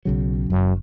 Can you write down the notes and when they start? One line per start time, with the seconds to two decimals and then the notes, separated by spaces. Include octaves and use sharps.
0.05 B1 C#3 F#3
0.50 F#1 F#2